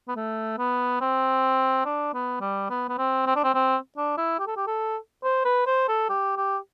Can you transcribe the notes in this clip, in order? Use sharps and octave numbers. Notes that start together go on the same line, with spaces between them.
B3
A3
B3
C4
D4
B3
G3
B3
B3
C4
C4
D4
C4
C4
D4
E4
G4
A4
G4
A4
C5
B4
C5
A4
G4
G4